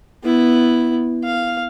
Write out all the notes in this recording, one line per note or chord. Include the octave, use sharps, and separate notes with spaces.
B3 E4
F5